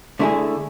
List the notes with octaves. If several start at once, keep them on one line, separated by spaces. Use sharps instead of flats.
D3 A3 E4 G#4